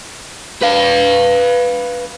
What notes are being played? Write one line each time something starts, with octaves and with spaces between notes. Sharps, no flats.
B4 F5